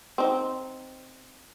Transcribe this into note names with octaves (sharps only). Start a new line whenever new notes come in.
C4 D#4